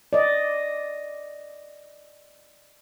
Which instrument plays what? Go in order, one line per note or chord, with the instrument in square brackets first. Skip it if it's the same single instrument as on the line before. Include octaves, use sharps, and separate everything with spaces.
[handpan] D5 D#5